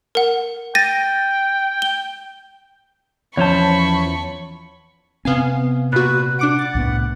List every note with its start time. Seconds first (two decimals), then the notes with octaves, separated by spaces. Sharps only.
0.15 A#4 F#5
0.75 G5 A6 A#6 D#7
1.82 G7
3.37 E2 F3 C#4 C5 C#5 A5 B5 C#6
5.25 C3 B3 C4 F5 G#5
5.92 A#2 F#4 B4
6.39 D4 F#5 D6 D7
6.59 A6
6.75 C2 A2 B3